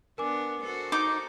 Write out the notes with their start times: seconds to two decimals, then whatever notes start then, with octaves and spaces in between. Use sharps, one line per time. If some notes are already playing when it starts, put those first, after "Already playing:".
0.18 B3 D4 A#4 G#5 D6
0.62 F#4 A4 C5
0.92 D#4 D6